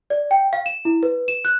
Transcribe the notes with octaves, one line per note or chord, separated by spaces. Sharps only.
D5
G5
F5
E7
E4
B4
E7
F#6